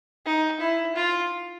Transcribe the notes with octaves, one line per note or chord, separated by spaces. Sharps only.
D#4
E4
F4